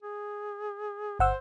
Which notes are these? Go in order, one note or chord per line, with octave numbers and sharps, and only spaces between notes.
G#4
G1 C5 F#5 E6